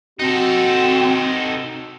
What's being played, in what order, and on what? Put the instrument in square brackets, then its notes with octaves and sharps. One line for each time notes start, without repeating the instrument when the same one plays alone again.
[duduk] C4 [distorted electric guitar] D#4 A4 [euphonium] F#4